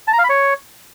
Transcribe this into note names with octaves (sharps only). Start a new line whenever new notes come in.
A5
A#5
F5
B5
C#5